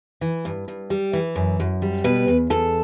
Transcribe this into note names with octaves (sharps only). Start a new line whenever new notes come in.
E3
G2
G2
G3
E3
F#2
F#2
G3
B2 B4
E2
E2 A4